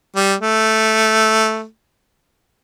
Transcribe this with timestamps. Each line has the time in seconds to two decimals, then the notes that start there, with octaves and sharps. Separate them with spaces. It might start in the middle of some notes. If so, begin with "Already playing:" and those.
0.16 G3
0.41 A3